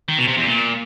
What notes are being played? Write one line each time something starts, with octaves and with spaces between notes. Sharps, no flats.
D#3
B2
C3
E2
A#2